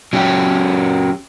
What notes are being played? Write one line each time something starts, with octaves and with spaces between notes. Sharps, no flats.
F#3 C#4 G4